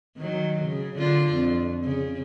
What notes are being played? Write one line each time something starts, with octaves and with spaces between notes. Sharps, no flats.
D#3 F#3
C#3
D3 D4 F4
F2
C#3